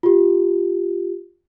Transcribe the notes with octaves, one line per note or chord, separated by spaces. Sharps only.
F4 G4